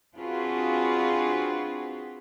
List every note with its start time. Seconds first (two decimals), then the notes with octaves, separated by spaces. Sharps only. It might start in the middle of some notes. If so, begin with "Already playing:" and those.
0.17 C4 D4 F4 F#4 G#4 B4